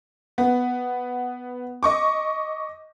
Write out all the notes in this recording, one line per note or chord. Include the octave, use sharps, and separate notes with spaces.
B3
D#5 C#6 D6